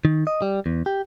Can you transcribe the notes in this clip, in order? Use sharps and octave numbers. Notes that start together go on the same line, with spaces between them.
D#3
D#5
G3
E2
G4